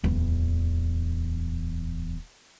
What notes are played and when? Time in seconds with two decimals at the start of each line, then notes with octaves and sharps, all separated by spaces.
0.04 D1 E2